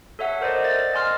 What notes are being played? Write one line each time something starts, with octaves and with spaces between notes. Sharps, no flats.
A4 C#5 E5 F#5
A#4 C5 D5 D#5
A6
D#5 G#5 C6 F6